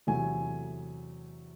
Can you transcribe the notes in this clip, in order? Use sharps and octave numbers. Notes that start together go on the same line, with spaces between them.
E2 C3 F#3 A3 G#5